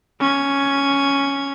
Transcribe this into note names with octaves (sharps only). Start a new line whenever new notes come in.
C#4 G#6